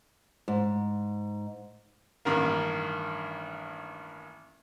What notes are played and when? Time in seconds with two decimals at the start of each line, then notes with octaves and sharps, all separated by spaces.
0.48 G#2
2.25 A1 G2 D#3 A#3